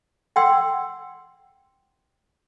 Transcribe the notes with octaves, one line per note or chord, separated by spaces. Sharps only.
F#5 G5 C6 E6